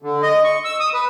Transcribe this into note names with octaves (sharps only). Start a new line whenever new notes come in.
D3
D#5
C#6
E6
D#6
B4